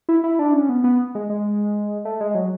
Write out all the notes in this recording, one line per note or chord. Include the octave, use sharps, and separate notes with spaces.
E4
E4
D4
C#4
B3
B3
G#3
G#3
A3
G#3
F#3